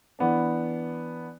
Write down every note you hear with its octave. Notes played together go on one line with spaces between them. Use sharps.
E3 B3 D4